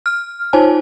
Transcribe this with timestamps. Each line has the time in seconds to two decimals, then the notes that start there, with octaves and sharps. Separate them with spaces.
0.06 F6
0.53 D#4 F4 C5 C#5 G#5 A5